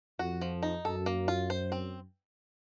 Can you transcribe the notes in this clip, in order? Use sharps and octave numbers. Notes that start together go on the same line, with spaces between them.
F2 F#4
F3
D#4
F#2 A4
A#3
F4
C5
C4